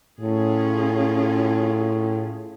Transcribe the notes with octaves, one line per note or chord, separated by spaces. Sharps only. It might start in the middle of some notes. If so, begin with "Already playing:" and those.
A2 C#4 F4 G#4